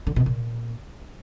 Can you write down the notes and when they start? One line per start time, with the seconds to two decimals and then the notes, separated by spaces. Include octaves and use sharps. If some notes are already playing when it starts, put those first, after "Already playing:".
0.07 D3
0.16 B2
0.26 A#2